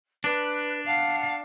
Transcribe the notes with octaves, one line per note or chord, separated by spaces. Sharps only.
D4 B4
F5 F#5 A5